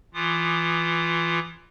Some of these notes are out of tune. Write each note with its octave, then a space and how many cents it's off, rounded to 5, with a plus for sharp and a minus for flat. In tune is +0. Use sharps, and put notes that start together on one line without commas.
E3 +10 F4 +0 D#6 -35